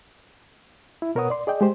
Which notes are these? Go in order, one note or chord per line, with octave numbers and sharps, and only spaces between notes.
E4
B2 A#4 B4 C#5 F#5 D#6
D5 C6
G#4 D5 D#5 G5
G#3 G4 C5